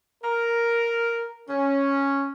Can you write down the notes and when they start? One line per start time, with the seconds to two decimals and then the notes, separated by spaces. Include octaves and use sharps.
0.24 A#4
1.49 C#4